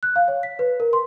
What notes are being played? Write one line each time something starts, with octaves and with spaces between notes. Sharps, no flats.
F#6
F5
C#5
B6
B4
A#4
C6